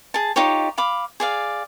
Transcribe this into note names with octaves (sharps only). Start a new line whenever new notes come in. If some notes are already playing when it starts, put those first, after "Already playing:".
G#4 A5
D#4 F4 G4 C#5
F5 B5 D6
G#4 D5 F5